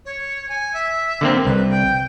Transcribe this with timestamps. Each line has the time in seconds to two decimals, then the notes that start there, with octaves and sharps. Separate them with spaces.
0.05 C#5
0.49 G#5
0.74 E5
1.21 D3 A#3 C4
1.45 C2 B4
1.69 G5